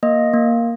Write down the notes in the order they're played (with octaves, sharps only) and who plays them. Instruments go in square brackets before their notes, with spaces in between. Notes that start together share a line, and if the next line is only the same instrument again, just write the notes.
[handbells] A#3 D#5
A#3